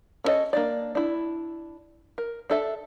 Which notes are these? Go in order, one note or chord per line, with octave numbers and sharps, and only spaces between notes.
C#4 D4 A4 C#5 D#5
A#3 D4 D5
D4 E4
A#4
D4 A4 E5